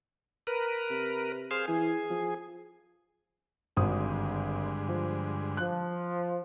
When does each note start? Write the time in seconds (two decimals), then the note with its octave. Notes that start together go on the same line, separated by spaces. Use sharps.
0.47 A#4 B4
0.90 C3
1.51 G#4 C5 F5
1.68 E3 G#4
2.10 F3
3.77 G#1 G2 D3 G#3 D#6
4.88 F3
5.57 F3 F#6